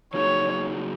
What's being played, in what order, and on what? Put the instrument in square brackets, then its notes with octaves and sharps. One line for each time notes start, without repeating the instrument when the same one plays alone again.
[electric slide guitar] C#3 F#3 A#3 D#4 G#4 [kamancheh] C#5